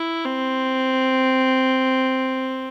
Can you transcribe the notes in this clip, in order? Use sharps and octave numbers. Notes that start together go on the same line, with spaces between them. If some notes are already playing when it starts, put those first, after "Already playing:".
Already playing: E4
C4